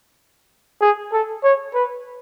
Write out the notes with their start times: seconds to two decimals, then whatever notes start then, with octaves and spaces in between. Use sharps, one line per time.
0.81 G#4
1.12 A4
1.43 C#5
1.74 B4